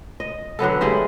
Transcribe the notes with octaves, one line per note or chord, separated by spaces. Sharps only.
D#5
D3 F#3 B3 A4
G3 G#3 E4 G#4